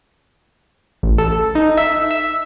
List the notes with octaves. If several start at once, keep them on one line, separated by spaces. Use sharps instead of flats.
A1
A4
D#4
E5
E5